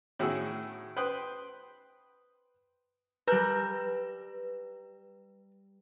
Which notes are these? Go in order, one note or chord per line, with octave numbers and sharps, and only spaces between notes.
A2 D#3 F#4 G#4 E6
B4 C5 G5 D#6 F#6
G3 A#4 B4 F#6 G6